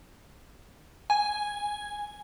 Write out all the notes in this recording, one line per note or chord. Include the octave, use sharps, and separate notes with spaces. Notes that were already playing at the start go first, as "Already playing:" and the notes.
G#5